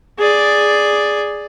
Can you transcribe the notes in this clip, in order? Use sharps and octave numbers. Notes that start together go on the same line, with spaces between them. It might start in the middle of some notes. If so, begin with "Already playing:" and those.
G#4 D5